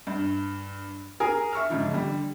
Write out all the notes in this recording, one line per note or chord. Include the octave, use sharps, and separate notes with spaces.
G2
G#4 A#4 G#5 A#5
E5 C#6 E6 F6
G#2 C#3 F3
D3 G3